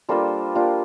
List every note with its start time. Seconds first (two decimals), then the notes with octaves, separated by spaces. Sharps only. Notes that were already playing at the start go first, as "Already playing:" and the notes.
0.09 G3 A#3 D4 F4 A4 C5
0.55 G3 A#3 D4 F4